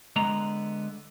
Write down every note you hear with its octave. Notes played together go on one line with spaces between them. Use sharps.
D3 G#3 B3 A#5